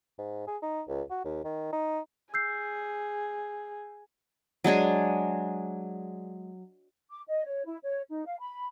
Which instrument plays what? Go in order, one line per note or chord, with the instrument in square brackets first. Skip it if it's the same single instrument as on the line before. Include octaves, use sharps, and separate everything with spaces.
[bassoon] G#2
G#4
D#4
C#2
F#4
D#2
D#3
D#4
[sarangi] G#4 [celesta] E6 G6 C7
[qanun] F#3 G#3 D4 G#4
[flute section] D6
D#5
C#5
E4
C#5
D#4
F5
B5